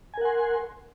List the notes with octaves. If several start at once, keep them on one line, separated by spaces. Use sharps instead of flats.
A#4 F#5 G#5 C6